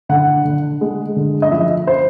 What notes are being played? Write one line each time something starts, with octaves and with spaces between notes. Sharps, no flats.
D3 F#5
D3
G#3
D3
D#5
F3 E5
C5